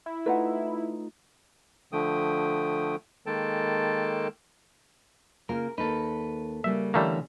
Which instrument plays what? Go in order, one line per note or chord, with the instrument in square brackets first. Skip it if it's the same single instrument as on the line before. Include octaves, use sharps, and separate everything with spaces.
[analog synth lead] E4
[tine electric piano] A3 D#4 F4 [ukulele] B4 F#5
[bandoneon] D3 F3 A3 G5 D#6
D#3 G#3 A#3 A4 G5 A5
[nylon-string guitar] C#3 A#3 F4 [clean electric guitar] A#4
[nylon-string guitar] D#2 A#3 D#4 [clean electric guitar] A4 B4
[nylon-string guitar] C#3 G3 A#3 [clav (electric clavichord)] E5
[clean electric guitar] D3 E3 C#4 [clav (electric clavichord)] G3 A3 A#3 [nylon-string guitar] A4